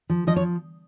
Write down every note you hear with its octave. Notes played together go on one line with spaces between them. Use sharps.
F3
F3 D#5
C#5